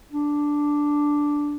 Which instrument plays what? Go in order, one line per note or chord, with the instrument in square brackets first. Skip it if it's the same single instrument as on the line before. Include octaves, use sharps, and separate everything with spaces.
[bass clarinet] D4